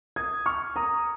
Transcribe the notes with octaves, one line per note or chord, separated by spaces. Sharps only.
D#6 G#6
C#6 F6
A#5 D#6